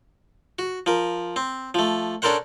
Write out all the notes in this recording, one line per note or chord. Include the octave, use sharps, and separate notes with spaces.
F#4
F3 A#4
C4
F3 A3
C#4 D4 A4 A#4 C5 F#5